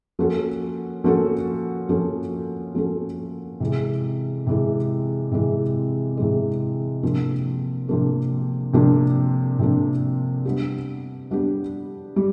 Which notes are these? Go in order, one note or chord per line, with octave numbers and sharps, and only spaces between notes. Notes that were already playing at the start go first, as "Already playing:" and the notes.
F3 A#3 C#4 F#4 A4
F3 A#3 C#4 F#4 A4
F3 A#3 C#4 F#4 A4
F3 A#3 C#4 F#4 A4
C3 E3 G#3
C3 E3 G#3
C3 E3 G#3
C3 E3 G#3
C3 F3 A#3 D4
C3 F3 A#3 D4
C3 F3 A#3 D4
C3 F3 A#3 D4
G3 B3 D4 G4
G3 B3 D4 G4
G3